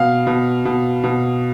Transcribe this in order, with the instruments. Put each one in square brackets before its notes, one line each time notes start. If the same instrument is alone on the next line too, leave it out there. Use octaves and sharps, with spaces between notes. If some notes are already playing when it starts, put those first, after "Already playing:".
Already playing: [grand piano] B2 F5
B2
B2
B2